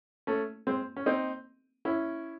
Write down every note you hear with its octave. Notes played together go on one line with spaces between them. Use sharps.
A3 C#4
G#3 C4
C#4
C4 D#4
C#4 E4